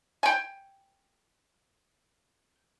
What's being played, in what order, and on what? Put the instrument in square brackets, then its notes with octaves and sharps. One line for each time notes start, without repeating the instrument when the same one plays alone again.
[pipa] G5 G#5